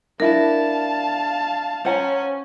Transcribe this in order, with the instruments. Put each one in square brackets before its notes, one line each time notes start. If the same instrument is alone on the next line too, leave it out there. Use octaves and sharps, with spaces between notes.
[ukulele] D4 E4 [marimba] A#4 [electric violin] F5 A5
[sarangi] C#4 [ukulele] C5 F#5 A#5